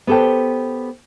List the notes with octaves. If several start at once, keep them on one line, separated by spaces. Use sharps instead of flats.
B3 G4 A4 C5 G5